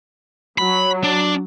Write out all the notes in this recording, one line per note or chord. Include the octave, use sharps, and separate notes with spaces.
F#3 B5
D4